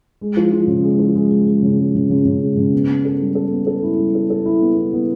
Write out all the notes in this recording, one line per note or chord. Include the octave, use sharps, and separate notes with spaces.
G#3
F3
F3
C#3
G#3
F3
G#3
G#3
G#3
C#3
G#3
C#3
C#3
C#3
G#3
C#3
B3
B3
A4
G3
A4
B3
A4
E4
G3
A4
A4
E4
B3
E4
B3